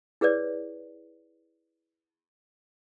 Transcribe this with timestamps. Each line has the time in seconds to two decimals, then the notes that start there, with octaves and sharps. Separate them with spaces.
0.21 E4 G#4 B4 C#5 D5